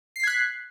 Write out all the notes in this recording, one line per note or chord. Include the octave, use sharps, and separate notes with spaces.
F#6 G#6 B6 C7